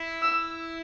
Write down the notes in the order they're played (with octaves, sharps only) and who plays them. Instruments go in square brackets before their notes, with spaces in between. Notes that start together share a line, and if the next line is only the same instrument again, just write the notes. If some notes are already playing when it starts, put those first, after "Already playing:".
Already playing: [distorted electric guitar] E4
[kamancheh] E6